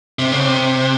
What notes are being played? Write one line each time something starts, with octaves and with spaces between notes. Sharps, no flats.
C3
C#3
C3